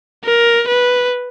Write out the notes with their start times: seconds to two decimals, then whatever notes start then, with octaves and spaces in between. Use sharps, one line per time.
0.25 A#4
0.68 B4